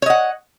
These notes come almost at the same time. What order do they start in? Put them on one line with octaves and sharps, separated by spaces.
C#5 D#5 F#5